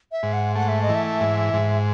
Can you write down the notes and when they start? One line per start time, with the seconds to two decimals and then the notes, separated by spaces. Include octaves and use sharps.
0.12 E5
0.23 G#2
0.33 F#5
0.55 A3 F#5
0.68 E5
0.82 D#5
0.89 E3
0.95 E5
1.21 G#2
1.54 G#2